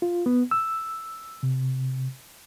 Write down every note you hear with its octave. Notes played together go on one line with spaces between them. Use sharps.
F4
B3
E6
C3